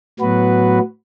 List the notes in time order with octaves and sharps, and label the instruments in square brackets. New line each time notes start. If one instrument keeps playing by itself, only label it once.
[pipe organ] A2 F#3 B3 F#4 B4